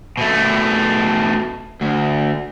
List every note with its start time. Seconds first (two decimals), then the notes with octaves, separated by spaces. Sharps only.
0.18 B2 A3
1.82 D2